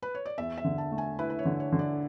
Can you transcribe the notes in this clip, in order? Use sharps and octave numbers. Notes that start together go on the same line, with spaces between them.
B4
C#5
D5
E2 E5
E5
D3
A5
A3
G#5
E4 B4
B4
C#5
D3
C#5
D3
D5